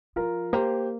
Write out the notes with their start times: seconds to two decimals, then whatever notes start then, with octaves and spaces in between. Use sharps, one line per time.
0.16 F3 F4 A#4
0.53 A#3 G4 C5